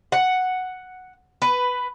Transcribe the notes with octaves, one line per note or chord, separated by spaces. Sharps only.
F#5
B4